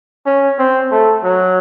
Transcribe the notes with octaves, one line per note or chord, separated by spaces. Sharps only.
C#4
C4
A3
F#3